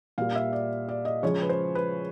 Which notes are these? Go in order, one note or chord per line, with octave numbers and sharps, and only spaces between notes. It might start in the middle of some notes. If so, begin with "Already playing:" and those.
A#2 G3 F5
E5
D5
D5
D#5
C#3 F3 G#3 C#5
B4
C5
B4